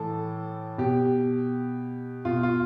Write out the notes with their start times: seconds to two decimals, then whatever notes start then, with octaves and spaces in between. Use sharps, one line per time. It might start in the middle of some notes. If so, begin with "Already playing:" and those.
Already playing: A2 E3 A4
0.78 B2 G4
2.25 B2 F4
2.43 F4